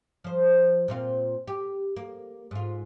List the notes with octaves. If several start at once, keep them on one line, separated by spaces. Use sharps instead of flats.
F3 C5
A#2 C4 F4
G4
A#3
G#2 F4